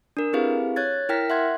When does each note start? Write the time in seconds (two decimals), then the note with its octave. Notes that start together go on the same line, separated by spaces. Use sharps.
0.17 D4 A#4
0.33 C4 E4 G4 G#4 B4 F5
0.76 C#5 F#6 G#6 A6
1.09 E4 A#4 G5 F6 A#6 B6
1.30 E5 F#5 C6 F#6 G#6